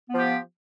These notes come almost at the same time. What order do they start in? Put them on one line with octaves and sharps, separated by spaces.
B3 F3 G4